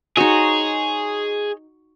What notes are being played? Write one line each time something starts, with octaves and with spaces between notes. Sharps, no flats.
D#4 F#4 G#4 C5 C#5 D#5